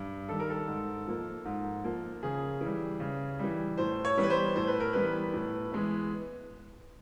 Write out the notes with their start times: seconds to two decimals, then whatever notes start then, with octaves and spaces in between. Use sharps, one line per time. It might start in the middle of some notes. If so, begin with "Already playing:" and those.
Already playing: G2
0.29 D#3 G3 A4
0.39 A#4
0.50 A4
0.68 G#2
1.07 F3 A#3
1.45 G#2
1.84 F3 A#3
2.23 C#3 G#4
2.61 E3
2.66 G3
3.00 C#3
3.39 E3 G3
3.77 A2 C5
4.05 C#5
4.17 E3 G3 B3
4.23 B4
4.30 C5
4.56 A2 C5
4.67 B4
4.80 A#4
4.93 E3 G3 B3 B4
5.34 A2
5.72 E3 G#3 B3